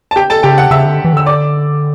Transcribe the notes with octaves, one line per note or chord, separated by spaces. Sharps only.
A5
G4 G5
A4 A5
C#3 G4 G5
F#5
C#3 E5 E6
D3
E3
D3 E6
D5 D6